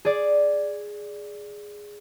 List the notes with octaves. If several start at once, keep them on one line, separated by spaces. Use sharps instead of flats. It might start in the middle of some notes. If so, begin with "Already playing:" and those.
G#4 D5